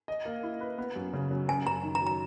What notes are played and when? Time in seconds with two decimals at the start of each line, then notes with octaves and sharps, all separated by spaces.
0.08 D#5
0.25 A#3
0.43 E4
0.61 B4
0.78 B3
0.96 F#2
1.13 C#3
1.31 F#3
1.48 F#2 G#5
1.66 F#2 A#5
1.83 D#3
1.95 A#5
2.01 F#3
2.07 A#5